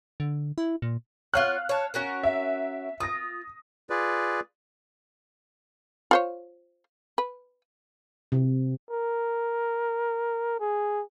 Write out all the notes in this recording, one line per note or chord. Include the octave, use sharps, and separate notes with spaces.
D3
E4
A#2
F4 C#5 F5 F#5 F6 F#6
C#5 A5
C#4 F#4 A#4
E5
F4 D#6 A#6
F4 G#4 B4 D5
F4 C5 C#5
B4
C3
A#4
G#4